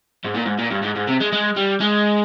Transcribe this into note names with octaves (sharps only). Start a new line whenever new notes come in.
G#2
A#2
G#2
A#2
G2
G#2
G#2
C3
G#3
G#3
G3
G#3